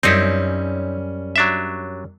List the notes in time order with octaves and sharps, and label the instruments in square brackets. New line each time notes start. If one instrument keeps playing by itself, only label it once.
[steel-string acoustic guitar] F#2 G3 C#4 [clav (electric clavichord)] C4 D#4 E4
[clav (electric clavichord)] F#3 D4 E5